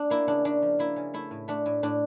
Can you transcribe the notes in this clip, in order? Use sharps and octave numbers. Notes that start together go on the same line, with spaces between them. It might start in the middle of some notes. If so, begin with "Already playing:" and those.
Already playing: D4
A#3 E4
C#3 D4
C#3 D4
F3
A#3 E4
C#3
A3 E4
A2
A3 D4
A2
A2 D4